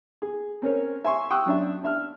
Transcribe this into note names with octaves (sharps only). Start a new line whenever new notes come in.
G#4
C4 C#4 A#4 C#5
E5 G#5 C6 C#6
G5 C#6 D#6 E6 F#6
F#2 D4 E5
D4 E5 F6